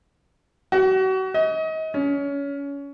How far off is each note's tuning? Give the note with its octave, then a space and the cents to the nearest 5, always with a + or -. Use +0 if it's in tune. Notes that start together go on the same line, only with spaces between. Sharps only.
F#4 +35
D#5 +35
C#4 +25